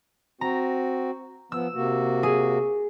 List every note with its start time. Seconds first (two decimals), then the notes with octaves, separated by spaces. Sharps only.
0.41 C4 F#4 A#5
1.52 F3 B3 E6
1.75 C3 A#3 F#4
2.23 G#4